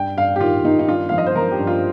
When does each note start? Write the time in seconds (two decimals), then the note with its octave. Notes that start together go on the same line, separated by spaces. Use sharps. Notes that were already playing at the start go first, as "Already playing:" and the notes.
Already playing: G2 G5
0.17 G2 F5
0.36 G4
0.40 D#3 F4
0.65 D#3 D#4
0.79 D#4
0.88 G2 F4
1.09 F3 F5
1.18 D#5
1.27 C5
1.36 F3 A#4
1.52 G4
1.59 G2
1.67 F4